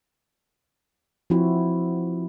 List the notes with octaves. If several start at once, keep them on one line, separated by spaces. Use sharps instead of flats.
F3 C4 E4 F#4